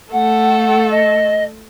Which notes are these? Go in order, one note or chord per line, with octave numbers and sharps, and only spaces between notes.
A3 A4 F#5
D#5